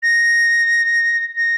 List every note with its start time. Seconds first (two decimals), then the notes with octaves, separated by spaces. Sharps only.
0.03 A#6
1.37 A#6